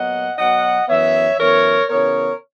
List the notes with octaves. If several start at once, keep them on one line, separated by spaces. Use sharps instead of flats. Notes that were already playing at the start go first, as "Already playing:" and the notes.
Already playing: A#2 F#3 B3 D#5 F#5
B2 F#3 B3 D#5 F#5
F#2 E3 B3 C#5 E5
F#2 E3 B3 A#4 C#5
C#3 E3 B3 A#4 C#5